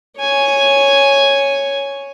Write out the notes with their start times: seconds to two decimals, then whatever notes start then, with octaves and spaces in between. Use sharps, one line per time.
0.19 C#5 G#5